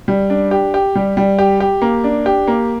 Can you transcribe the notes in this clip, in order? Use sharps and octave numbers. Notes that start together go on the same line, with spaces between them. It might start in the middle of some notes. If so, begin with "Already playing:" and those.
G3
D4
G4
G4
G3
G3
G4
G4
A#3
D4
G4
A#3